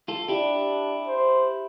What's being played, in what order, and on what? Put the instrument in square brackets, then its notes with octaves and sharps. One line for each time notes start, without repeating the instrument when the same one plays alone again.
[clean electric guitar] F4 A4
[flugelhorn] D4 [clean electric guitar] E4 G4
[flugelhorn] C5